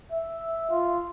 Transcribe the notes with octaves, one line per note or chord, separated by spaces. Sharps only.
E5
F4